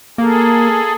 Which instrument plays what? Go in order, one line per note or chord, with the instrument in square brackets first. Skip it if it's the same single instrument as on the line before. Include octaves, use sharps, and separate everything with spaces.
[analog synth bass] A#3 [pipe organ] G#4 A4